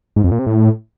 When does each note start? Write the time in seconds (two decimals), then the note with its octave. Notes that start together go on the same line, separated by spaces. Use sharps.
0.16 G#2
0.24 F2
0.31 A#2
0.39 C3
0.46 A2